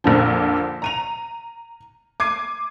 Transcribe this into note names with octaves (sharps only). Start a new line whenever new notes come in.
A#1 F2 A#2 D3 F3
A#5 D#7 F7
D6 G#6 C7 D#7